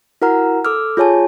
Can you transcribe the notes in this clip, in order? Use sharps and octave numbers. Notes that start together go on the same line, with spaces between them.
E4 F#4 A#4 F#5 A#5 F6
A4 D6 E6 F6
F4 G#4 C#5 G#5 A5